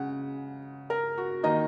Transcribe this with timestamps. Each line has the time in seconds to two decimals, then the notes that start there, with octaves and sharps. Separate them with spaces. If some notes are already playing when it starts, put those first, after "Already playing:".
Already playing: C#3 G#3 F#5
0.90 A#4
1.18 F#4
1.43 D#3 A#3 D#4 D#5